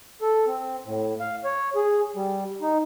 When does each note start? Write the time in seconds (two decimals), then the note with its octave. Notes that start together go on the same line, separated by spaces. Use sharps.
0.21 A4
0.47 C4
0.86 A2
1.20 F5
1.44 C#5
1.76 G#4
2.16 G3
2.62 D#4